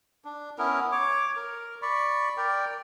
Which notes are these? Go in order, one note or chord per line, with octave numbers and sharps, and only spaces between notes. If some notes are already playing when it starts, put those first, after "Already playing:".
D4
B3 C#4 E4 A#4
C#5 D6
A#4
D5 B5 C#6
A#4 D5 G5